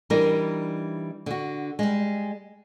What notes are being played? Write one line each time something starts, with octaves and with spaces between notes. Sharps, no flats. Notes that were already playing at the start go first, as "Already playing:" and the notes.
E3 G3 D4 D#4 A#4
D3 F#4
G3 G#3